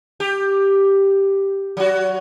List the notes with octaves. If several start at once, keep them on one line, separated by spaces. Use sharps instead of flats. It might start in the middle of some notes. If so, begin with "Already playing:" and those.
G4
F#3 F#4